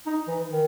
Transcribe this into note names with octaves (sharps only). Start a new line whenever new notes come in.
D#4
E3
D#3